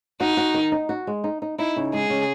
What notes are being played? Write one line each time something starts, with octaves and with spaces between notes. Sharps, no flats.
D#4 F#4
F#4
D#3
D#4
F#4
G#3
D#4
D#4
D#4 E4
C#3
G#3 G#4
C#3